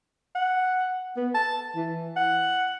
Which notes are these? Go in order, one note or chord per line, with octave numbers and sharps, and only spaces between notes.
F#5
B3
A5
E3
F#5